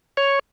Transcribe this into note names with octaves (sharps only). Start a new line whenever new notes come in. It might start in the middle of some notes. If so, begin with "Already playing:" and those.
C#5